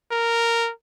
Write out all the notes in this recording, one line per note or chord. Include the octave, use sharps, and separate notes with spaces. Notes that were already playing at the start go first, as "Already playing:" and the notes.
A#4